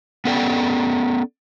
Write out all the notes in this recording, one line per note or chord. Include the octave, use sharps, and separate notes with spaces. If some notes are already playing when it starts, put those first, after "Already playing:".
B3 C#4 A4 D5 G5